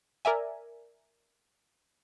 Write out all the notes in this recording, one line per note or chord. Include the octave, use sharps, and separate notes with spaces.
A#4 D5 E5 G#5